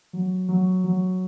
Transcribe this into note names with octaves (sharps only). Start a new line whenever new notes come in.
F#3
F#3
F#3